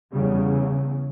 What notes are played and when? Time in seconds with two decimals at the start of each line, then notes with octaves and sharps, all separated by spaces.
0.12 E2 C#3 G3